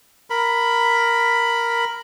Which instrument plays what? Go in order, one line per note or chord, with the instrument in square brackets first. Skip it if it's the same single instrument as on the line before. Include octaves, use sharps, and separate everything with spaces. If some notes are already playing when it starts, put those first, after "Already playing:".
[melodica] A#4 B5